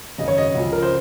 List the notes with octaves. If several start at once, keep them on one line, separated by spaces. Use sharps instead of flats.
G#1 F#2 C#3 D#5
C#5
D#5
C#2 C#3 F3
A#4
C5